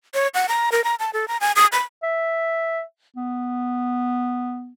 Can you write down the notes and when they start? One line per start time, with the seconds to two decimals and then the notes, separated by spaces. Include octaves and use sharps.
0.14 C#5
0.34 F#5
0.49 A#5
0.72 A#4
0.84 A#5
0.99 A5
1.13 A4
1.28 A#5
1.41 G#5
1.56 D#6
1.72 B5
2.03 E5
3.16 B3